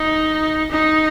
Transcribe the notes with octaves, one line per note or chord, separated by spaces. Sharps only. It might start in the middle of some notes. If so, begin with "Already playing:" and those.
Already playing: D#4
D#4